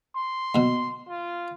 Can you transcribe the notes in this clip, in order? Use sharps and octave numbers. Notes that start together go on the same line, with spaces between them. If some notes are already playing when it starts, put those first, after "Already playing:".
C6
D#2 B2
F4